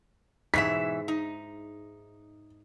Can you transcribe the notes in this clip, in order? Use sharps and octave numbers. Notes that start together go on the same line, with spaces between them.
G#2 B2 E3 G#3 E5 B6
D#4